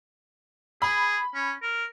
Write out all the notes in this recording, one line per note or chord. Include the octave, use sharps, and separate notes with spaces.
G#4 B5
C#4
A#4